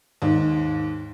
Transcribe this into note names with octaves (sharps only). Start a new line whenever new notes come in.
D#2 G#2